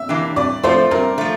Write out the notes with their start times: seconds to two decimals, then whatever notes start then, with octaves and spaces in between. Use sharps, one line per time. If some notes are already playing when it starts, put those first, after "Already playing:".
Already playing: E5
0.09 E3 A#3 D4 G4
0.36 G2 D5
0.63 F3 A3 C5
0.91 G2 A#4
1.18 F3 A3